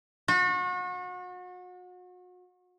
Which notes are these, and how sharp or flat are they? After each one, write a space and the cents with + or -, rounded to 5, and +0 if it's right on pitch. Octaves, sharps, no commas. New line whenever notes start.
F#4 -35